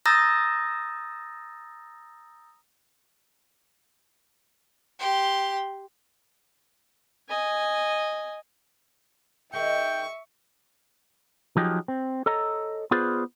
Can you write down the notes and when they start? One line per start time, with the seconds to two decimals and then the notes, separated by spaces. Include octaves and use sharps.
0.06 A#5 D#6 E6 G6 A6 A#6
4.99 G4 C6
7.29 D#5 G#5
9.53 D#3 G#3 E5 G5 C#6
11.57 F3 F#3 D#4 G4 G#4
11.88 C4
12.26 A4 C#5 D#5 A#5
12.91 B3 F4 G#4 B4 C5 D5